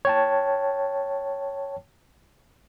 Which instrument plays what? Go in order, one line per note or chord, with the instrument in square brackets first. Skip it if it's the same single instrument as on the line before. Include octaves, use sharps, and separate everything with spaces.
[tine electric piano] C#5 G5 A5